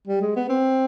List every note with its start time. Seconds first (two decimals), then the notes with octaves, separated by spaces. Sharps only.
0.08 G3
0.22 G#3
0.36 B3
0.49 C4